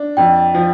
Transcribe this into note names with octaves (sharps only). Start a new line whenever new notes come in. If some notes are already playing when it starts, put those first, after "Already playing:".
Already playing: D4
F2 G5
F3